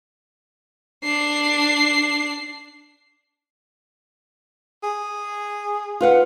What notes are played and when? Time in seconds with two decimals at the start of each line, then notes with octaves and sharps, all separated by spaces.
1.04 D4 C7
4.83 G#4
6.00 F4 B4 F#5